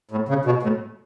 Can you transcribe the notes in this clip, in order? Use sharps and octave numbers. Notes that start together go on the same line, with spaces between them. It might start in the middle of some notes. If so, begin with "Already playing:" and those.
A2
C#3
B2
A2